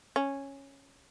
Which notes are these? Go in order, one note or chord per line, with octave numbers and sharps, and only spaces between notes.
C#4